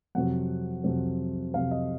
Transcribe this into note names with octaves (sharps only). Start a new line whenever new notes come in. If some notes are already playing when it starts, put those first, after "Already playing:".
F2 C3 F#3 C4 F#5
F2 C3 F#3 C4
F2 C3 F#3 C4 F5
D#5